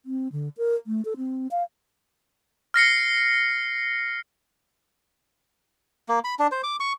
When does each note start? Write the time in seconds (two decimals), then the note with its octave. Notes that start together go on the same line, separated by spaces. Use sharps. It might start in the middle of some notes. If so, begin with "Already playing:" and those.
0.06 C4
0.32 D3
0.57 A#4
0.87 A3
1.05 A4
1.17 C4
1.51 F5
2.74 F6 A#6 C7 C#7
6.09 A#3
6.24 B5
6.39 D4
6.52 C5
6.63 D6
6.80 C#6